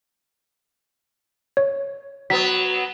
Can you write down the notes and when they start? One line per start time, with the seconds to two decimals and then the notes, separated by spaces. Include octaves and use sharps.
1.57 C#5
2.30 F#3 B3 B6